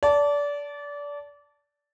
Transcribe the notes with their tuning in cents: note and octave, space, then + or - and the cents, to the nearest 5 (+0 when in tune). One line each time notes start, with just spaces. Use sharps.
D5 -25 A5 +0